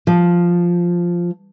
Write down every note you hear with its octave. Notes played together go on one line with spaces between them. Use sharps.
F3